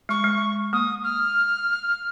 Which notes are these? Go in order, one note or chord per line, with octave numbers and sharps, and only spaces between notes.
G#3 C#6
G#3
A#3 D#6
F6